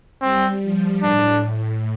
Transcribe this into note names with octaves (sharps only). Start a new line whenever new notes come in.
G3 C4
F3
A2 D4